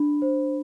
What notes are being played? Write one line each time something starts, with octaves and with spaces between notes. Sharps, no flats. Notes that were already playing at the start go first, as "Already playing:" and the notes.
Already playing: D4 B5
C5